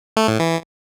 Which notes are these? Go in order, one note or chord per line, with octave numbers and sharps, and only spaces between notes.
A3
A2
E3